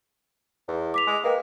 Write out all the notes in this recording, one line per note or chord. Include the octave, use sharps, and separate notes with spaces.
E2
D6 B6 F7
G#3
A#3 B4 D#5 G5